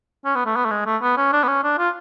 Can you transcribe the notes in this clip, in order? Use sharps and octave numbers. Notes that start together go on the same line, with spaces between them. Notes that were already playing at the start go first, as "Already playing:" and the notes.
C#4
B3
A3
B3
A3
G#3
A3
B3
C#4
D4
B3
C#4
D4
F4